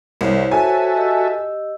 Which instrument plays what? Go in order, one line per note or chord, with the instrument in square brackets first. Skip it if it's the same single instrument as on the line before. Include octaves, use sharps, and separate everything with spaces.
[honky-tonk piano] C2 [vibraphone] C5 C#5 F#5
[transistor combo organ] F#4 A4 E5 [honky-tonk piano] G#5
[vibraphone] G4 D#5 E6